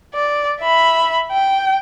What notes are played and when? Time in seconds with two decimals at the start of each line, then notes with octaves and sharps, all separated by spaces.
0.14 D5
0.61 E5 B5
1.32 G5